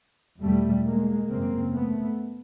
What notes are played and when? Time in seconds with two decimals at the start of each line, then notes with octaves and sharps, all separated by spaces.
0.41 E2 B2 G3 A3
0.86 G#3 A#3
1.29 F#2 C#3 A#3 C4
1.73 A3 B3